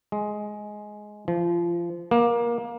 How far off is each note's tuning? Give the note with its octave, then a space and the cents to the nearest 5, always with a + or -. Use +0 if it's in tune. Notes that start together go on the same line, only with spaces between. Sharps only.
G#3 +10
F3 -25
A#3 +20